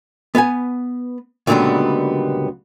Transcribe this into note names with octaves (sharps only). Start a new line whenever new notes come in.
B3 B4 F#5 G#5
C#2 A#2 D3 F#3 G3 B3